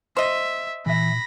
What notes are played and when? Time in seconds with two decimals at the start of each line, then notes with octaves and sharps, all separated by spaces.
0.17 C5 D#5 E5
0.86 A#2 E3 E5 B5 A#6